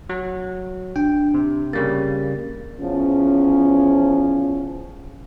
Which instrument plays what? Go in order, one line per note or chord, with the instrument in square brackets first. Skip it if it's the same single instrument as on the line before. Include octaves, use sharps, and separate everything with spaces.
[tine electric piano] F#3
[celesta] D4 [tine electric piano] G5
[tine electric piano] C3
[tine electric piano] C#3 G3 A#3 [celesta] A#4 A6
[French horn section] E2 F3 C#4